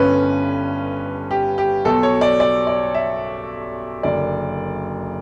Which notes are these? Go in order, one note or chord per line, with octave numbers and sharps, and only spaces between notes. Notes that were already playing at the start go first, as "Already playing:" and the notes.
Already playing: G1 G2 D3 C#4 B4
G4
G4
B1 B2 A4
C#5
D5
D5
D5
E5
F#1 F#2 D3 D5